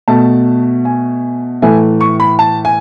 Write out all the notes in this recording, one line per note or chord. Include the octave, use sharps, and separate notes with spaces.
B2 A3 A5
G#5
A2 E3 A3 G#5
C#6
B5
A5
G#5